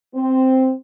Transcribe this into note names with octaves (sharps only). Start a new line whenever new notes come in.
C4